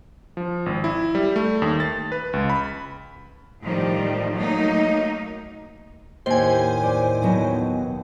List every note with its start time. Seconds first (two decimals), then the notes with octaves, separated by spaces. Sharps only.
0.37 F3
0.66 G#1
0.84 E4
1.15 G3
1.36 A3
1.62 D#2
1.80 A6
2.12 B4
2.33 C#2
2.50 B5
3.61 A2 D#3 F3 G3
4.34 F#3 A3 A#3 D#4
6.26 D#2 A2 C5 G#5
6.83 D5
7.22 B2 F#3 D#4